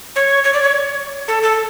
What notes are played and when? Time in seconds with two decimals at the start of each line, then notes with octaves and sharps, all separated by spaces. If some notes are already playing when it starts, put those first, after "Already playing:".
0.16 C#5
0.44 C#5
0.53 D5
0.62 C#5
1.28 A4
1.43 A4